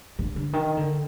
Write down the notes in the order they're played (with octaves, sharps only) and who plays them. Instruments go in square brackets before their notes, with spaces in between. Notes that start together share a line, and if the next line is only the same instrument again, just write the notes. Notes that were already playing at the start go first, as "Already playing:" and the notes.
[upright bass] D3
D3
D#3
D3